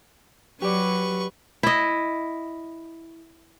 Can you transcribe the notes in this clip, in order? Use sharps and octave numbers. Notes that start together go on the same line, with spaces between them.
F#3 G4 B4 D5 C#6
E4 D#5